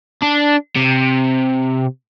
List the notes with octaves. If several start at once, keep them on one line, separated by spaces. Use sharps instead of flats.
D4
C3